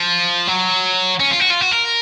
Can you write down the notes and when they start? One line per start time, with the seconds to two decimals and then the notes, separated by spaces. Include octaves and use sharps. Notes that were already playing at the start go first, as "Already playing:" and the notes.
Already playing: F3
0.48 F#3
1.20 C#4
1.31 F4
1.40 F#4
1.51 F4
1.61 F#4
1.72 A#4